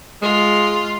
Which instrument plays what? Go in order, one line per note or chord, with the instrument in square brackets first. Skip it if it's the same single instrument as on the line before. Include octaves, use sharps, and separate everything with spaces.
[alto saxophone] G#3 [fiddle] F4